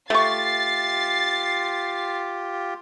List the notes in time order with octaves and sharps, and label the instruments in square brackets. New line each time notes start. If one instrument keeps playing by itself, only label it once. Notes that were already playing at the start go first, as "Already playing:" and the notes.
[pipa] A3 C#6 [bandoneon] F4 G4 [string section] A6 C7